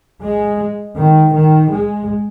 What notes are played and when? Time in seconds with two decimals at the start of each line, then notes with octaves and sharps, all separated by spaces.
0.23 G#3
0.97 D#3
1.35 D#3
1.72 G#3